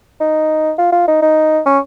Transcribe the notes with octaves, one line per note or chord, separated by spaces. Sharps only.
D#4
F4
F4
D#4
D#4
C#4